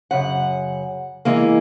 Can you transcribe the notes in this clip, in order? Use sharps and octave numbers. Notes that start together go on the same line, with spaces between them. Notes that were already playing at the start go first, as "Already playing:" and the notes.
F#2 C#3 F#5
E3 G#3 A#3